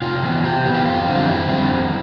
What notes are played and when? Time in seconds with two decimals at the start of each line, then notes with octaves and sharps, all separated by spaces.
0.02 C3 F4
0.23 E3 B3
0.43 C3 G4
0.65 E3 B3
0.74 G4
0.85 F2 F4
1.07 D3 G3 C4
1.17 F4
1.28 F2 E4
1.49 D3 G3 C4
1.70 F2